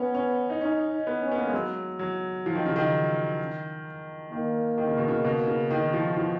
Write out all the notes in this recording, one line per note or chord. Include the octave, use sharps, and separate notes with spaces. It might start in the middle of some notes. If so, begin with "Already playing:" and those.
Already playing: B3 C#4
C#4
D#4
C#4 D#4
B3
C#4
B3
A#3
G#3
F#3
F#3
F3
D#3
C#3
D#3
D#3 A#3
D#3
C#3
B2
C#3
B2
C#3
D#3
F3
F3